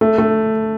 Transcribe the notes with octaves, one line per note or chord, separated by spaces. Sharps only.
A3
A3